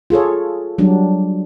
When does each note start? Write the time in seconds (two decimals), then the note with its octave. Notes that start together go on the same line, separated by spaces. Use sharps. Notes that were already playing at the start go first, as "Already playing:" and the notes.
0.10 F4 G#4 A4 C#5
0.78 F#3 G3 D4